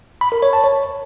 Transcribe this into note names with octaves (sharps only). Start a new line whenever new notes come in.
B5
A#4
C#5
A5
C#5